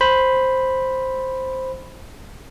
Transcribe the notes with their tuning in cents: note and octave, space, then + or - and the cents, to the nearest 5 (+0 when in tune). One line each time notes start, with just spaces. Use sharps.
C5 +0 B5 +0